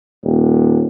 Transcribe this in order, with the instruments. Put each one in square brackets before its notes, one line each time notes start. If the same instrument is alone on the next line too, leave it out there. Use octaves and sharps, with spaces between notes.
[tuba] D#1